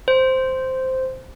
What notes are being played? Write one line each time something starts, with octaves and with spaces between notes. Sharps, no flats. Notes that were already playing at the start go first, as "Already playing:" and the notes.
C5